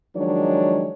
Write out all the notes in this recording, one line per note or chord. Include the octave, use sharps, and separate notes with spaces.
D#3 F3 F#3 G#3 D4 C#5